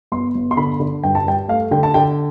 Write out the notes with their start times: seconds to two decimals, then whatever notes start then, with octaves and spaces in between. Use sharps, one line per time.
0.12 G1 C6
0.35 G1
0.51 C6
0.57 D3 B5
0.80 D3
1.04 G2 G5
1.15 A5
1.27 G2 G5
1.48 A3 F5
1.71 D3 G5
1.83 A5
1.94 D3 G5